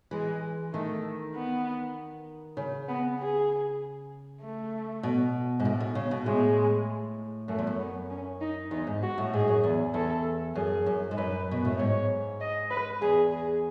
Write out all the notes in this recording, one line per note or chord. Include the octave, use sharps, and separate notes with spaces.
E3 G#3
D#3 A3
B3
C#3
B3
G#4
A3
B2
G#2
A2
B2
C#3
B2
A2 G#3
F#2 A3
E2
F#2
B3
C#4
D#4
E2 D#4
G#2
F#4
A2
G#2 G#4
F#2
E2
E2 A4
F#2 G#4
F#2
G#2
F#2 B4
B2
A2
G#2 C#5
D#5
B4
E2 G#4
G#4